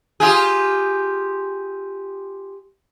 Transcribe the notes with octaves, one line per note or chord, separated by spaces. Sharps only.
F4 G4 G#4